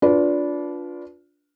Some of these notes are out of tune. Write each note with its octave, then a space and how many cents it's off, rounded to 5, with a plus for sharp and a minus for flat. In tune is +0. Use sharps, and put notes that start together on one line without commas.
D4 -20 F4 +10 B4 +0